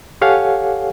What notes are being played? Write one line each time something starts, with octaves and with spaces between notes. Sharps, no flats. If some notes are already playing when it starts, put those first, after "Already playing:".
G4 A4 C#5 F5 F#5 G#5